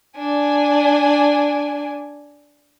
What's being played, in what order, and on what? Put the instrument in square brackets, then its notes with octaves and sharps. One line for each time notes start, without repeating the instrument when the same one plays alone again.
[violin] D4 G#5